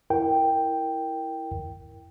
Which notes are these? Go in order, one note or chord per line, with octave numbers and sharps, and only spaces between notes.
E4 A#4 G5